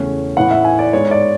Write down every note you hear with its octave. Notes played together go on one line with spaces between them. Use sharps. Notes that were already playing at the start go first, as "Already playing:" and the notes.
Already playing: E2 C#3 E3 A3 C#4
A2 E3 B3 F#5
E5
G#5
D5
G#2 G#3 B3 C#5
D5